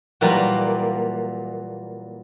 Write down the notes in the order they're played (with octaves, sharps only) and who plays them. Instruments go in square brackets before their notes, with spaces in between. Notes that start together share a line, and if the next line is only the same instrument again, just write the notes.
[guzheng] A#2 E3 F#3 G3 A#3